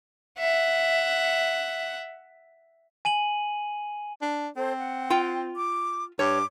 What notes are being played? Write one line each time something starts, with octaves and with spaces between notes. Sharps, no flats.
E5 F#5
G#5 D#7 F#7
D4
C4 A4 C5
F#5
F4 G5
D6
G2 C#5 D6